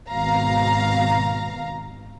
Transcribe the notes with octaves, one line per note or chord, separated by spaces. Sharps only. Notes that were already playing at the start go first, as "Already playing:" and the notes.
G#1 B2 F5 A#5